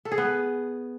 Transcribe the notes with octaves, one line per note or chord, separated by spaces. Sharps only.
A4
G#4
B3